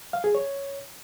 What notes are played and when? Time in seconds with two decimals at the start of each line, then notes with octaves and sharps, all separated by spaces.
0.13 F5
0.24 G#4
0.35 C#5